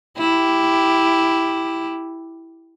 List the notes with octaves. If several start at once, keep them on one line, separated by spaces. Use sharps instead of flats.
E4 G4